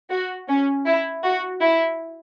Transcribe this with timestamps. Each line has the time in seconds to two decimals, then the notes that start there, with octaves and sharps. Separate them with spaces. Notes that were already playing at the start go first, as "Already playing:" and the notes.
0.10 F#4
0.48 C#4
0.85 E4
1.23 F#4
1.61 E4